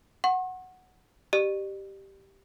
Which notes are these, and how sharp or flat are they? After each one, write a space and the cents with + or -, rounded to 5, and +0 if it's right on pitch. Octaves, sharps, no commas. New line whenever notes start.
F#5 +0 C#6 -45
G4 -5 D5 +45